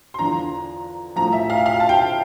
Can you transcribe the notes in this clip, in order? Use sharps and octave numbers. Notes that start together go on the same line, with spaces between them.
C6
E2 D3 F3 A#5
A2 F3 A#5
E5
F5
F5
A5
G5